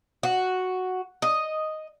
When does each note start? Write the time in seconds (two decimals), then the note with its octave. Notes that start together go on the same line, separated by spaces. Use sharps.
0.23 F#4
1.22 D#5